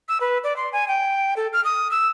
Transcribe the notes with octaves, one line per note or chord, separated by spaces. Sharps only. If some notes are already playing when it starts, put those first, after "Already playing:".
E6
B4
D5
C6
G#5
G5
A4
F6
D#6
E6